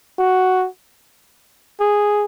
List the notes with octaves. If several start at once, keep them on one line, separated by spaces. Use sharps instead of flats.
F#4
G#4